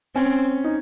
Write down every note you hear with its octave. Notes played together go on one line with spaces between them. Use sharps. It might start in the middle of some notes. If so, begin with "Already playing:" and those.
C4 C#4
D#4